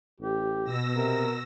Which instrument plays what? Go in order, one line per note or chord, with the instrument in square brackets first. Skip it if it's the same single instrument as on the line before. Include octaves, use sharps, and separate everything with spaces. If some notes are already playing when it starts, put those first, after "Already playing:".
[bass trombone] A1 [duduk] G4
[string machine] B2 E6 A#6
[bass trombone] C3 [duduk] A#4